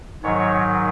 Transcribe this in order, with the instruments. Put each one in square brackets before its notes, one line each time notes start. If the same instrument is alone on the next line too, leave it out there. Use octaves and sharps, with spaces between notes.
[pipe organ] G#2 D#3 F#3 C#5